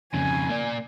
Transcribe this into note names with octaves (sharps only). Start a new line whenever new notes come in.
F2 C#3 G#5
A#3 D5